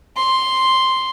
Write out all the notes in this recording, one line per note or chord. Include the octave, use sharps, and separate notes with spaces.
C6